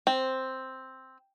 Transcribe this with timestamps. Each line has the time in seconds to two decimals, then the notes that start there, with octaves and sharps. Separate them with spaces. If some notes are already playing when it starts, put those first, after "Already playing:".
0.07 C4